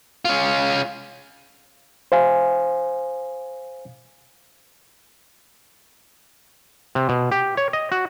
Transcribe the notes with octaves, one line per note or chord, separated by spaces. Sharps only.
C#4 F4
C5 F5 G#5
C3
B2
G4
C#5
D#5
F#4